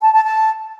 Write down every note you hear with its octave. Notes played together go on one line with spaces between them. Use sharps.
A5
A5
A5